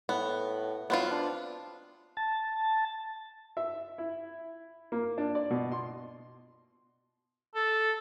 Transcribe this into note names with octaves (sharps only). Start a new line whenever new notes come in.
A2 B3
F#3 B3 C4 F4
D4
A5
E5
E4
A#3
D4
D5
B2
C6
A4